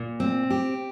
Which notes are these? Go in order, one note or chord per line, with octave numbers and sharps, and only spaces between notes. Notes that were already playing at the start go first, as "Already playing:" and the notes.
Already playing: A#2
C4
G4